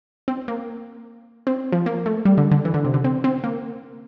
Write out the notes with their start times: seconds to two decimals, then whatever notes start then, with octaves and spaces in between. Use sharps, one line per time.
0.28 C4
0.48 A#3
1.47 C4
1.72 F3
1.86 A#3
2.06 A3
2.25 G3
2.38 D3
2.51 D3
2.65 E3
2.74 D3
2.84 C3
2.94 D3
3.04 C4
3.24 C4
3.44 A#3